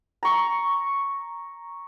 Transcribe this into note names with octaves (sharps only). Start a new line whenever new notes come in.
A#5 C#6